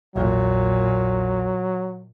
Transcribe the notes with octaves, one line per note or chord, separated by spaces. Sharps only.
A#1 E2 A#2 F#3